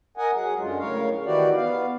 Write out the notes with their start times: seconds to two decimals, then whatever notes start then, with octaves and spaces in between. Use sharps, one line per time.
0.17 A#4 D#5 F#5 G#5
0.35 F#3 G#4 F#5
0.59 F#2 D3 G#3 F4
0.79 A2 C#3 A#4 C#5 F5
1.25 D#3 E3 E4 F#4 G4 D5
1.56 B3 F5